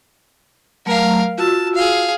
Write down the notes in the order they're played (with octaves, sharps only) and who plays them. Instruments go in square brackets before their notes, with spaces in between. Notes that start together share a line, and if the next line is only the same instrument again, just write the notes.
[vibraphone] F#3 A3 A#5 [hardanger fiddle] A#4 F5
[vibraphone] F4 F#4 E6 [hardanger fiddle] A5
[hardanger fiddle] G#4 F5